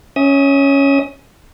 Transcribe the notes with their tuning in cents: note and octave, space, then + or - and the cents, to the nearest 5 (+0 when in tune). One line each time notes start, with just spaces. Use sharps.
C#4 +0 E5 -30 D#6 +20